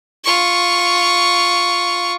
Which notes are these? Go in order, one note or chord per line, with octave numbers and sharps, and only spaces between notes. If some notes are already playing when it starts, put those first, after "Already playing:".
F4 C#6